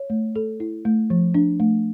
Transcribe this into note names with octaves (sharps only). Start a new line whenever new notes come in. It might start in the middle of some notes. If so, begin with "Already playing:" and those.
Already playing: C#5
A3
A4
E4
A3
F3
D4
A3